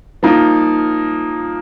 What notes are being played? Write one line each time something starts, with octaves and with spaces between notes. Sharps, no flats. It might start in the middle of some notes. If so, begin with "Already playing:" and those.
F3 A#3 D#4